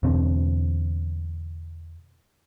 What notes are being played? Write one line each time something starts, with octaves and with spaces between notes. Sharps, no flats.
E2 B2 D3 C4